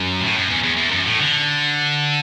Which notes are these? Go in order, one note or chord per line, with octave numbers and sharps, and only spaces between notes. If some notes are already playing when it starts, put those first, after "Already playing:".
Already playing: F#2
A2
F#2
E2
E2
E2
F#2
A2
D3